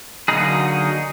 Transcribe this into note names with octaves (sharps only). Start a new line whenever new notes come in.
D3 F#3 A#3 D#4 G#4